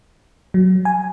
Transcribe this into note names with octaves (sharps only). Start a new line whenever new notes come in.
F#3
G#5